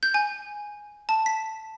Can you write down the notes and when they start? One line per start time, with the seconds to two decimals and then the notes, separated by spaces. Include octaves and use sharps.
0.03 G6
0.14 G#5
1.09 A5
1.26 B6